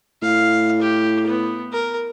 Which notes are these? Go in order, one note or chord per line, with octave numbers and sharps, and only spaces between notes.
A2 F5
G4
B3
A#4